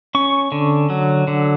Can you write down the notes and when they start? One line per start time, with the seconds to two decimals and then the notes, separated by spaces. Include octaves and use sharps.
0.15 C#4 C#6
0.52 D3
0.90 F#3
1.27 D3